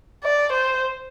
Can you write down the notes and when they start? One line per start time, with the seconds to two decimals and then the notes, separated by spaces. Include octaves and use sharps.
0.24 D5
0.52 C5